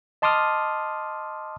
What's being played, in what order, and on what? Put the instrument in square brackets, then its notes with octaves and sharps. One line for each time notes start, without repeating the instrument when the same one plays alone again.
[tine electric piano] D#5 A5 C6 D6 D#6 F6